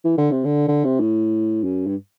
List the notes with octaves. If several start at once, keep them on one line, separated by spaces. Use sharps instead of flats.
E3
D3
C3
D3
D3
C3
A2
F#2
G2